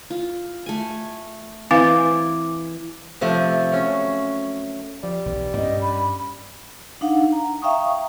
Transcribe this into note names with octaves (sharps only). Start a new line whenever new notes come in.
F4
A3 G#5
E3 C4 C5 F5 D6
C3 F3 A3
F#3 C#4
F3 G3
B1 E3
G2 C#4 D#5
B5
D4 D#4 F5 F#5
A#5
E5 F5 G5 A#5 C#6 D#6